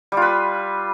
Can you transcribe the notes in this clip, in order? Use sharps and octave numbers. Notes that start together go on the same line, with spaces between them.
G3 F4 B4